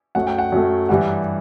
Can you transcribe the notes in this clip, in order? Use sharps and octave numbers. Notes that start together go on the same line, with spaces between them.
F#2 F#3 A3 F#5
G5
F#5
F#2 F#3 A3
G2 E3 G3 F#5